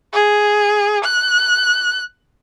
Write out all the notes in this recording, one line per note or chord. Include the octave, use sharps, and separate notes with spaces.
G#4
F#6